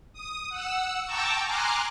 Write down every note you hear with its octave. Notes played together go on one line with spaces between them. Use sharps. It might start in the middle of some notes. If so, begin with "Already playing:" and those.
D#6
F#5 E6
G5 A5 A#5 C#6 D6 E6
G#5 A#5 C6 D6 F6 F#6